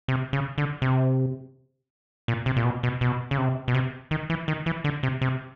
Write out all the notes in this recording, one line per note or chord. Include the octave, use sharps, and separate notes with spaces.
C3
C#3
D3
C3
A#2
C3
A#2
B2
B2
B2
C#3
C3
B2
C3
D#3
E3
D#3
E3
D3
C3
C3